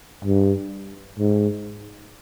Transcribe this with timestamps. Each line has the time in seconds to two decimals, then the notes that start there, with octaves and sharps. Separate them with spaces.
0.25 G2
1.19 G#2